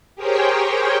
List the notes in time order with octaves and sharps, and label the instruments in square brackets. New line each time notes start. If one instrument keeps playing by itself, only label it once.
[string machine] G4 G#4 A#4 C5 C#5 G5